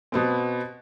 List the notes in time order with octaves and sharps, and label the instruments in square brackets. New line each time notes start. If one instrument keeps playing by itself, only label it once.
[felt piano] B2 B3 C4